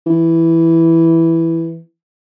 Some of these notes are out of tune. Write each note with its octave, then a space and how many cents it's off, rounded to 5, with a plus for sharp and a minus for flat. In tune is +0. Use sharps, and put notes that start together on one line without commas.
E3 +0